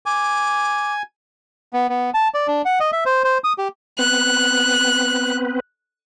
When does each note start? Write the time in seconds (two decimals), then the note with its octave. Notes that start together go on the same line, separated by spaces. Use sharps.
0.06 G#5 D6
1.73 B3
1.89 B3
2.14 A5
2.34 D5
2.48 D4
2.65 F#5
2.80 D#5
2.92 E5
3.06 C5
3.24 C5
3.44 D#6
3.58 G4
3.99 B3 C4 B4 F#6